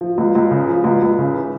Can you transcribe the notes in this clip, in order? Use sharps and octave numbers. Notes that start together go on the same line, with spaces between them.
F3
C#2
C#2
C#3
F3
C#2
C#2
C#3
E3